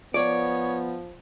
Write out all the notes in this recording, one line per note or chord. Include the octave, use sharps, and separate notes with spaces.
F3 B3 C#5 D5